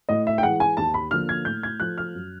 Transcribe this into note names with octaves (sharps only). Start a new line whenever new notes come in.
A2 D#5
E5
G5
E3 G#3 F#5
G#5
D#2 A5
B5
D3 F3 A#3 F6
G#6
A2 G6
G#6
F3 A3 F#6
F6
F#2